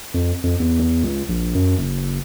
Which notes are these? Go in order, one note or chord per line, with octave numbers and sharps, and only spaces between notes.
F2
F2
E2
E2
C#2
A#1
F#2
F#1